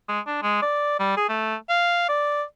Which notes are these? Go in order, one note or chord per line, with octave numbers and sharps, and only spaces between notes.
G#3
D4
G#3
D5
G3
G#4
A3
F5
D5